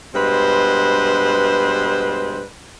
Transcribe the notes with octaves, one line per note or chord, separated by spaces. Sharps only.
G2 B2 G#3 B4 C5